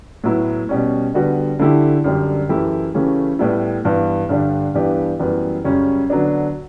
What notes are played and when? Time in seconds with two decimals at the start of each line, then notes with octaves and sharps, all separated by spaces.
0.24 A2 F#3 B3 E4
0.69 B2 G3 C#4
1.14 D3 G3 B3 F#4
1.59 D3 A3 E4 G4
2.04 F#2 D3 G3 D4 G4
2.49 F#2 E3 A3 E4 G4
2.94 C#3 E3 A3 C#4 G4
3.39 A2 G3 B3 E4
3.85 G2 E3 B3
4.29 G2 D3 G3 D4
4.74 G2 E3 B3 D4 G4
5.19 F#2 E3 G3 B3
5.64 F#2 C#3 G3 C#4
6.10 D3 F#3 B3 D4